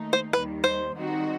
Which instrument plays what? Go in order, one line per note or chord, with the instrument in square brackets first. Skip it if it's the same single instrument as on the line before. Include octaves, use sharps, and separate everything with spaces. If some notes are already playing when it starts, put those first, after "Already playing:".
Already playing: [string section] D#2 D#3 A3 D#4
[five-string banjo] C5
[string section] D#2 D#3 G3 [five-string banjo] B4
[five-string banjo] C5
[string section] D#3 G3 C4 D#4 F#4